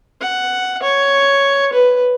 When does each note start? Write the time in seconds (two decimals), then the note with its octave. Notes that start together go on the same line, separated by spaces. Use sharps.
0.22 F#5
0.82 C#5
1.73 B4